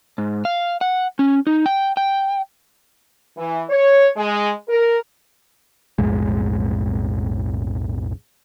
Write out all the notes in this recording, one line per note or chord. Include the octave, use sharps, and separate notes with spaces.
G#2
F5
F#5
C#4
D#4
G5
G5
E3
C#5
G#3
A#4
B1 F2 A2 G#3